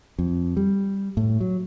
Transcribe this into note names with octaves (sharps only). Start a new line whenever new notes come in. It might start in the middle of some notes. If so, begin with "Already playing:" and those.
F2
G3
A2
F#3